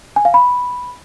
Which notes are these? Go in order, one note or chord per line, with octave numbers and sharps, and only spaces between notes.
G#5
F5
B5